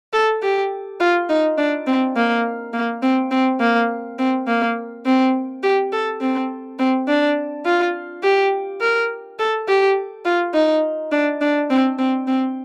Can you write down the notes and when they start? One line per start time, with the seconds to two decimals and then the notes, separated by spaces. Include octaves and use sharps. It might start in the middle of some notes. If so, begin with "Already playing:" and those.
0.13 A4
0.43 G4
1.00 F4
1.29 D#4
1.58 D4
1.87 C4
2.16 A#3
2.73 A#3
3.02 C4
3.31 C4
3.60 A#3
4.19 C4
4.47 A#3
5.05 C4
5.63 G4
5.92 A4
6.21 C4
6.79 C4
7.08 D4
7.65 F4
8.23 G4
8.81 A#4
9.39 A4
9.68 G4
10.25 F4
10.54 D#4
11.12 D4
11.41 D4
11.70 C4
11.98 C4
12.27 C4